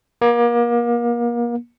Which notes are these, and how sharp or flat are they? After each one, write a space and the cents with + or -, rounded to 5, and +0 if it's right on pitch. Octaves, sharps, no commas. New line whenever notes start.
A#3 +35